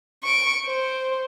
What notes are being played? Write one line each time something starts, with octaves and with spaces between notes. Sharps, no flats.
C#6 D7
C5